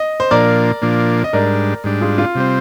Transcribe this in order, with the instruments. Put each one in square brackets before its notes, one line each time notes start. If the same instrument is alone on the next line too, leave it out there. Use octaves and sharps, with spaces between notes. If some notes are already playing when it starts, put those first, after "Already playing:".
Already playing: [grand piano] D#5
C5
[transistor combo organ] A#2 F3 A#3 D4 [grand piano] A#4 D5
[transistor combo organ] A#2 F3 A#3 D4
[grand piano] D#5
[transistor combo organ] G#2 G3 D4 [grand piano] A#4 D5
[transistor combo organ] G#2 G3 D4
[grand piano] F4 G#4
F4
[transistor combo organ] C3 G3 C4